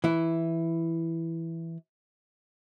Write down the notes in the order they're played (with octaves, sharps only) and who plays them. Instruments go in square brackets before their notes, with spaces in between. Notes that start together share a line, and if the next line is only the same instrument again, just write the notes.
[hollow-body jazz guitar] E3 E4